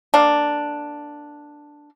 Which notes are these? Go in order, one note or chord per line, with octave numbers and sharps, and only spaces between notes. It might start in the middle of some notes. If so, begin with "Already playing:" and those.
A#3 D4